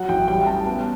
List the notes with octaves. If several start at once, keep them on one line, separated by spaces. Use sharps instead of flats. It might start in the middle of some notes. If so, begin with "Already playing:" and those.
Already playing: F#3 F#5
A1 G5
G3 G5
C#4 A5
B3